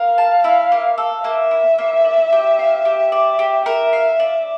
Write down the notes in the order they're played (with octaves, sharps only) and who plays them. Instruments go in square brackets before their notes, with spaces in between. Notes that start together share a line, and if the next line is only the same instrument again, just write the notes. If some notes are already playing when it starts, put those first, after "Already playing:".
Already playing: [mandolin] A#4 [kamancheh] F5
[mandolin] A5
E4
A#3
A4
[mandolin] A#3 [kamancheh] E5
[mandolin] E4
A#3
D5
G4
F5
G4
D5
G4
[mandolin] A#4 [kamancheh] E5
[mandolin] F5
D5